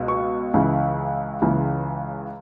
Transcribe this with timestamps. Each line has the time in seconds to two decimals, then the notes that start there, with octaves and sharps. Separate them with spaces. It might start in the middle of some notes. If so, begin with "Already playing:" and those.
Already playing: C#2 B2
0.08 C#6
0.54 C#2 C#3 E3
1.42 C#2 C#3 E3